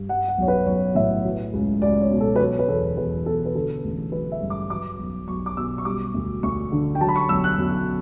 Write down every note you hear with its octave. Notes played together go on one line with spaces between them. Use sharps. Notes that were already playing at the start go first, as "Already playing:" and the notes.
Already playing: G2
G3 F#5
F#5
B1 C#5
B4
B1 C#5
A2 E5
F#3
C#2
C#2 D5
C#5
B2
A4
B4
F#3 C#5
B4
E2 A4
E2 B4
B2 A4
B4
D3 A4
A1
F#3 B4
E5
G2
D6
F#3 D6
B1
B1 C#6
D6
B2 E6
C#6
G3 D6
D2
D2 C#6
D3
G5
F#3 A5
B5
C#6
B1 E6
F#6
B1